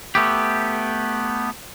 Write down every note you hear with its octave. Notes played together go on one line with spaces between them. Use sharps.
A3 B3 G4